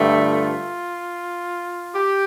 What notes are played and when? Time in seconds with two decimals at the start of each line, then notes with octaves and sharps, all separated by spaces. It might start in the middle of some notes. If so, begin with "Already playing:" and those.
Already playing: G2 D3 A3
0.19 F4
1.95 G4